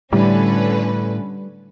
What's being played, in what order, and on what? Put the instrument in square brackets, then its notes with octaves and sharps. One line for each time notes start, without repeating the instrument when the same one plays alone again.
[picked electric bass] A2 [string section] D3 C#4 B4 [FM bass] G3